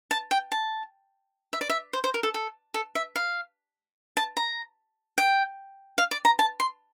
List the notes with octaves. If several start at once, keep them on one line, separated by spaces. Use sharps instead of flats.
A5
G5
A5
E5
D5
E5
C5
C5
A#4
A4
A4
A4
E5
F5
A5
A#5
G5
F5
D5
A#5
A5
C6